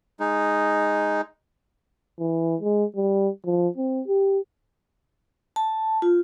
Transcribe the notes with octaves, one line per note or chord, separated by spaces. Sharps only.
G#3 D#4
E3
G#3
G3
F3
C4
G4
A5
F4